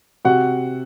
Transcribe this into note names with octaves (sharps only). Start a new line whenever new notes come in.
C3 F#4 F#5